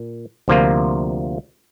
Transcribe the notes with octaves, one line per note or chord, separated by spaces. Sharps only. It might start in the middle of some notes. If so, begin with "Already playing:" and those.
Already playing: A#2
D2 C3 F3 A#3 F4